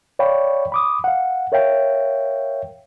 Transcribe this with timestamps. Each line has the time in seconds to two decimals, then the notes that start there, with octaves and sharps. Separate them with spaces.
0.19 C#5 D5 F5 G5 B5 C#6
0.72 B5 D6 D#6
1.04 F5 F#5
1.52 A#4 C#5 E5 F5 G5